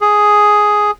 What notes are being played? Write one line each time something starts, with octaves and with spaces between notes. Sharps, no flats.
G#4